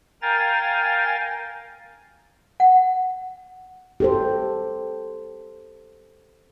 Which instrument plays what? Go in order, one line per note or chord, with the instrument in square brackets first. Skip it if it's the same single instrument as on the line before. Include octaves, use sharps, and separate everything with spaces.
[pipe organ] A#4 F5 G5 G#5 A#5 A6
[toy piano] F#5
[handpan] G4 A4 C5